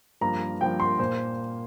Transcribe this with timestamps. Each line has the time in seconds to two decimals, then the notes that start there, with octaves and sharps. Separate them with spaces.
0.21 G2 F3 A#3 A#5
0.60 G2 F3 A#3 G5
0.80 C6
0.99 A#2 A#3 C5